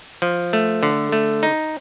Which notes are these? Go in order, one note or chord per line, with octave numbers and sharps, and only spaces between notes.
F3
A3
D3
A3
D#4